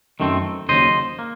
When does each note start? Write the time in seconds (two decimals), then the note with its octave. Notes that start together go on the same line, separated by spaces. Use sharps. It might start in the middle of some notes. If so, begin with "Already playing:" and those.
0.20 F#2 D#3 A3 C4
0.69 D#2 C#3 F#3 C5 D#5
1.19 A#3